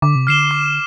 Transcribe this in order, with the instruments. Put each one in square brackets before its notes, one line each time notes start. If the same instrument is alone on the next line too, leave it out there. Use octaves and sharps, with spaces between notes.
[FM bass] D3 [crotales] D6
[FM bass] C3
[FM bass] D3 [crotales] F6 C7 E7 G7
[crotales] D6